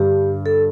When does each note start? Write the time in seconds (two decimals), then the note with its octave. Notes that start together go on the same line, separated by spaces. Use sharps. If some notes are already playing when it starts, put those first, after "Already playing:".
Already playing: G2 D3 G3 G4
0.46 A4